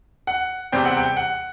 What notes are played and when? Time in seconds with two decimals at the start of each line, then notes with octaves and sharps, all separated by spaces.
0.27 F#5
0.72 E2 C3 G3 C4 G5
0.85 F#5
0.97 G5
1.17 F#5